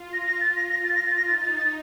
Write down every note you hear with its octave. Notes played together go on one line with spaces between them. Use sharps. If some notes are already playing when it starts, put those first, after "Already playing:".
Already playing: F4
A#6
A#6
F4 A6
A#6
A#6
A6
A#6
A6
A#6
D#4 A6
A6
A6